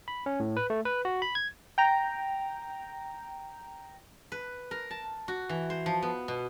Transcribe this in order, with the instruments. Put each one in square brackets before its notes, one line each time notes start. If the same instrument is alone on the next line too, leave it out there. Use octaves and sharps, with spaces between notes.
[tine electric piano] B5
C#4
A2
B4
A3
B4
F#4
B5
G#6
[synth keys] G5 A#5
[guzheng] B4
A#4
A5
F#4
E3
C5
F3
B3
B2